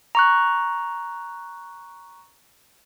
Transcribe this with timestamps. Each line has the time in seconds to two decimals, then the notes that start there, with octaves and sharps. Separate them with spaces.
0.15 A#5 C#6 F#6